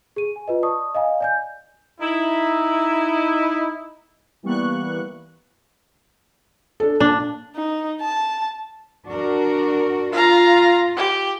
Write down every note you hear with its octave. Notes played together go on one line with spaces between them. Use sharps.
G#4 D#7
G#5
F4 B4 D#5
D5 A5 C#6 D#6
D#5 F5 G#5 A#5
D5 G#5 G6
D#4 E4
E3 G3 A#3 B3 C#6 F#6
D4 A4
A#2 D4
D#4
A5
D4 F#4 A#4
F4 F5 A#5
G4